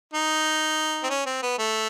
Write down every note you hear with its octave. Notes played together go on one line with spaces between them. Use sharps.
D#4
C4
C#4
C4
B3
A3